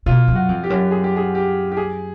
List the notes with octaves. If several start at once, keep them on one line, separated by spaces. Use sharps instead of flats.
B2 F4
F#2
F#4
F2
G4
F#2
G#4
G4
G#4
G4
G4
G#4